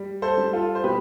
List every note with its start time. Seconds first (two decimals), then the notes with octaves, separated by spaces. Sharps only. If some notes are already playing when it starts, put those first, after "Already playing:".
Already playing: G3
0.22 A4 C5
0.37 G3
0.53 F4 A4
0.75 C5
0.84 B2 G4 B4